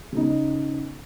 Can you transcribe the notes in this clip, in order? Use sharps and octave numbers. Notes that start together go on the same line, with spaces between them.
C#3 B3 D#4